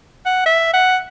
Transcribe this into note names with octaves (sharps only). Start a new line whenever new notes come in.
F#5
E5
F#5